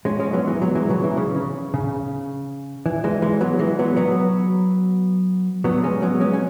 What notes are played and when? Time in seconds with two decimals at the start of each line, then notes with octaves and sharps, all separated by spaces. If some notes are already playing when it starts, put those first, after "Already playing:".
0.05 G#3 C#4
0.20 G#3 C#4
0.33 F#3 B3
0.48 E3 G#3
0.62 F#3 B3
0.75 E3 G#3
0.89 C#3 F#3
1.04 E3
1.17 C#3
1.36 C#3
1.74 C#3
2.86 E3
3.04 E3 G#3
3.22 E3 G#3
3.41 F#3 B3
3.59 E3 G#3
3.79 F#3 B3
3.97 F#3 B3
5.64 F#3 B3
5.83 G#3 C#4
6.02 F#3 B3
6.20 G#3 C#4
6.33 C#4